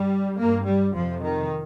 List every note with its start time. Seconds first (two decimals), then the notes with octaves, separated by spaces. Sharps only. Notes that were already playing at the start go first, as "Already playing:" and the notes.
Already playing: G2 G3
0.39 G2 A#3
0.68 G3
0.95 F2 C3 F3
1.24 D#3